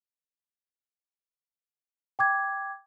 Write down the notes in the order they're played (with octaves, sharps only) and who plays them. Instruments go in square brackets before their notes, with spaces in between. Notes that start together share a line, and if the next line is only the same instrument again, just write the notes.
[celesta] G5 D6 G#6